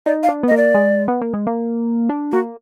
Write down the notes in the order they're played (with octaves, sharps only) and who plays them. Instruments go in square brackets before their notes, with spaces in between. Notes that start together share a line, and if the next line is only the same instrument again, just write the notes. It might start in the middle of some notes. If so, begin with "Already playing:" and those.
[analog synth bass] D#4 [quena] D5
[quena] F5
[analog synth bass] D4
B3
[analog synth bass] A#3 [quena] D#5
[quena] D5
[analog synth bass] G#3
B3
A#3
G#3
A#3
D4
[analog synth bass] A#3 [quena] F#4